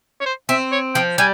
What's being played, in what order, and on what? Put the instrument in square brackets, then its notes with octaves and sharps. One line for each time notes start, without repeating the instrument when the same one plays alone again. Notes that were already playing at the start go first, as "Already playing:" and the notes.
[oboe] C#5
C5
[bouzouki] C4 [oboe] E5
[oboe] C#5
[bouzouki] F3 [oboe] G5
[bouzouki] G3 [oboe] G#5